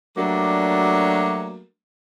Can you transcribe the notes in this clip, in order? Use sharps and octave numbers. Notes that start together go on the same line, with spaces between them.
F#3 G3 A3 A#3 D4